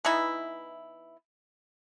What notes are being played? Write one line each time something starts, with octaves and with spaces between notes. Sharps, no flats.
E3 B3 D#4 E4